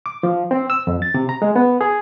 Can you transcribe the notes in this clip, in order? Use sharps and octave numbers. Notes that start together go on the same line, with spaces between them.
D6
F3
C4
E6
F2
A6
C3
A#5
G#3
B3
G#4